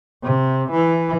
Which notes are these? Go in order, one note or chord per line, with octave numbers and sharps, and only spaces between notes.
C3
E3